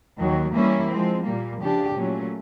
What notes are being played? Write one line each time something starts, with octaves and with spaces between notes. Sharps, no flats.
D#2 D#3 F#3
E3 G3 A#3 C#4 E4
F3 G#3 C4
A#2 G3 A#3
C#3 F3 A3 D4 G4
A#2 F#3 A3 C#4